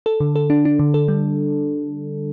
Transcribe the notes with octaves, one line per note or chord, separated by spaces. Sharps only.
A4
D3
A4
D4
D4
D3
A4
G3